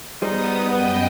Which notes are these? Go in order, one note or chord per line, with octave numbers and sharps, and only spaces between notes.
G3 B3 D#4 G#4 C5 D#6
F#2 B3 D#5 G5